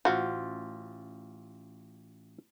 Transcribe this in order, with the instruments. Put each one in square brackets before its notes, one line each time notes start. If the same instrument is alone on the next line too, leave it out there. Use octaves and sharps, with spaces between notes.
[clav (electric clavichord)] A1 F4 C5 [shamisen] F#4